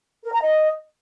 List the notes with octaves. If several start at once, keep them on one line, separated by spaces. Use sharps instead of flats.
A#4
A#5
D#5